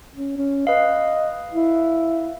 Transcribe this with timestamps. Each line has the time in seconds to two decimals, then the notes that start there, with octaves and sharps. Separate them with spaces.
0.15 C#4
0.38 C#4
0.67 B4 D#5 F5
1.52 E4